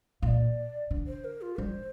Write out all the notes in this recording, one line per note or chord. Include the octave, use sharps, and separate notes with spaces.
A#2 D5 F5
D3
C5
A#4
F4
G3 C5